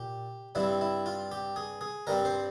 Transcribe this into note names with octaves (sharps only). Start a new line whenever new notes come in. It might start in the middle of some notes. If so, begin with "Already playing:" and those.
Already playing: A#2 G4
G2 G3 C4 E4
E4
F4
G4
G#4
G#4
G2 G3 C4 A#4
C5